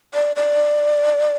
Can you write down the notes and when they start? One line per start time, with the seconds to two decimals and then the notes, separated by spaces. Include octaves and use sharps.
0.14 D5
0.36 D5